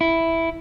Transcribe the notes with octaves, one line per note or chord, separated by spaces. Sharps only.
E4